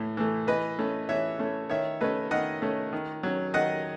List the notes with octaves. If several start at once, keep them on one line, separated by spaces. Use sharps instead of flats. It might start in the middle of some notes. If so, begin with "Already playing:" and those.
Already playing: A2 E3 A3
E3 A3
E3 B4 D#5
A3 C#4
E3 C#5 E5
A3 C#4
D#3 C#5 E5
A3 C#4 B4 D#5
D#3 D#5 F#5
A3 C#4
D#3
F#3 C#4
D#3 D#5 F#5